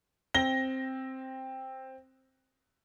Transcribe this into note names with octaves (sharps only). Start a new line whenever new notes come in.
C4 A#6 G7